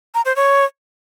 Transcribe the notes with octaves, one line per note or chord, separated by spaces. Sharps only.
A#5
C5
C#5